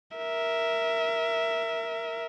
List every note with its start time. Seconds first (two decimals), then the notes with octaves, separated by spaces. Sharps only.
0.17 A#4 E5